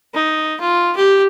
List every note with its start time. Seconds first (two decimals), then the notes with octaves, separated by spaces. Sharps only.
0.14 D#4
0.60 F4
0.96 G4